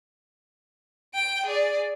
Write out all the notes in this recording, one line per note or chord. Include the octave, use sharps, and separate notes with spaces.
G5 D7
G#4 D5